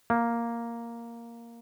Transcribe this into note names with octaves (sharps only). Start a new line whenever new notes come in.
A#3